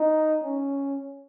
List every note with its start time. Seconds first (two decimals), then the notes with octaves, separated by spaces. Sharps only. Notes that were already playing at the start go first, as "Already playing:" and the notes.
Already playing: D#4
0.44 C#4